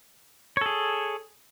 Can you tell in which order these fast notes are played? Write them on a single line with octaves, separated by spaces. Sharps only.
C#5 A4 G#4